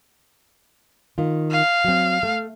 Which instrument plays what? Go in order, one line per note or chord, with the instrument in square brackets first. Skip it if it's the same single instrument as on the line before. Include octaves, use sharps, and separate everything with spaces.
[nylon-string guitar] D#3 F4
[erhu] F5
[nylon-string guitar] F#3 C4
A3